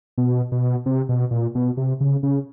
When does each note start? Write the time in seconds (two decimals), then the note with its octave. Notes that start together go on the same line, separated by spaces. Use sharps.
0.18 B2
0.52 B2
0.86 C3
1.09 B2
1.31 A#2
1.55 B2
1.77 C3
2.01 C#3
2.23 C#3